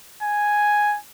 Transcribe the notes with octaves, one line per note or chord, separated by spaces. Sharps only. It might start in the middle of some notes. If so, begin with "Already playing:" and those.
G#5